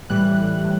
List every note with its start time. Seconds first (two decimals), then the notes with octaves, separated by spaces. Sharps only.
0.10 A2 E3 G3 F#6
0.64 A2